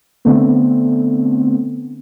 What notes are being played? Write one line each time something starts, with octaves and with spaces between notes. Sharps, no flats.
D3 A3 B3 C4